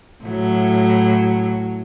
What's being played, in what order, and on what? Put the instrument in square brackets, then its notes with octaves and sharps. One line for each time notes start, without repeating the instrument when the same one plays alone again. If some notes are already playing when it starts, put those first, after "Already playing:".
[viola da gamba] A2 F#3